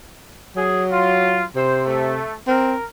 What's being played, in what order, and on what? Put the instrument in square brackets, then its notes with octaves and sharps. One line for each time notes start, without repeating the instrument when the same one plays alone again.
[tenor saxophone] F#3 [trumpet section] G#4
[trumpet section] F4
[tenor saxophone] C3 [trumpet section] C5
[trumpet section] A3
[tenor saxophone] C4 [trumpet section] A#4